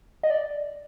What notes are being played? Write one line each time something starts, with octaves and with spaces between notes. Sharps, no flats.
D#5
D5